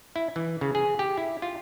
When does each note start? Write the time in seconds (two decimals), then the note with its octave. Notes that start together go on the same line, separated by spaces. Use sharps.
0.16 E4
0.36 E3
0.61 C#3
0.75 G#4
0.99 G4
1.18 E4
1.42 F4